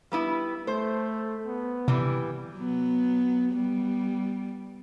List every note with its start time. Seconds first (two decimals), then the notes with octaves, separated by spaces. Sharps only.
0.12 G3 B3 E4
0.67 A3 C5
1.46 B3
1.88 C3 E3 G3
2.54 F#3 B3
3.52 G3 B3